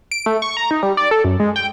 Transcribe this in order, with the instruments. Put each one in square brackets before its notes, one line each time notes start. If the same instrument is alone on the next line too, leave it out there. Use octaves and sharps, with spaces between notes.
[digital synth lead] D7
A3
C#6
A#5
D#4
G3
D5
A4
F#2
G#3
G5